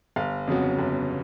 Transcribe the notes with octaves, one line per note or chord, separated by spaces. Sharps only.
G1 F5
F2 C#3 F#3 B3
G1